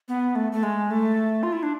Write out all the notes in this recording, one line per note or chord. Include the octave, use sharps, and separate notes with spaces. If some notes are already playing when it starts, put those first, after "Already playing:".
B3
A3
A3
G#3
A3
F4
E4
D4